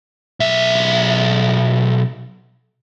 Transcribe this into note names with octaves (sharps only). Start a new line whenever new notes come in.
B1 E5